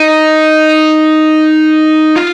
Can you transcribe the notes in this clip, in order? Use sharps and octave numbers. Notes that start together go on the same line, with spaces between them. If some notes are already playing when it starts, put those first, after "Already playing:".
Already playing: D#4
F4